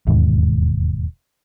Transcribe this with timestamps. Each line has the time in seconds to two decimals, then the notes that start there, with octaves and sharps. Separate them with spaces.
0.07 E1 D#2 G#2